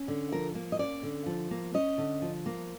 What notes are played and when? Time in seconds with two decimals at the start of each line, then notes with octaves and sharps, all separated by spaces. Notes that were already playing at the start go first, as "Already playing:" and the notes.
Already playing: C#4
0.08 D3
0.32 F3 A#4
0.55 A#3
0.72 D#5
0.79 C#4 D5
1.03 D3
1.26 F3
1.51 A#3
1.74 C#4 D#5
1.98 D3
2.22 F3
2.46 A#3